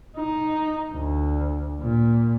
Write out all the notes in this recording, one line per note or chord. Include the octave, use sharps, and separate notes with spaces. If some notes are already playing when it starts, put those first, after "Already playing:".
D#4
D2
A#2